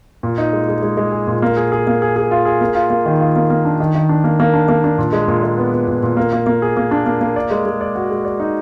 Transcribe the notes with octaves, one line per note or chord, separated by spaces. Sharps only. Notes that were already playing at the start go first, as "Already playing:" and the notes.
A#2
D#4
G#3
G#3
G#3
G#3
G#4
A#2
A#3
G#4
G#4
A#3
G#4
G#4
F4
G#4
A#3
F4
A#3
D#3
F4
A#3
A#3
D4
D#3
D#3
D4
A#3
A#3
D4
A#3
D4
A#2
G#3
A#2
G#3
B3
B3
A#2
A#2
A#3
A#3
A#3
G#4
A#3
D4
A#3
A#3
D5
G#3
G#3
D5
F#4
G#3
D5
D#4